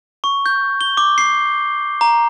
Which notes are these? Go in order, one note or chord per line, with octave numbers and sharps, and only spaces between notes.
C#6
G6
G7
D6
C7
A#5